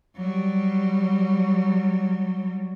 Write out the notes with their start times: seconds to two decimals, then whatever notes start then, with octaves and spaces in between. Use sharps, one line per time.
0.16 F#3 G3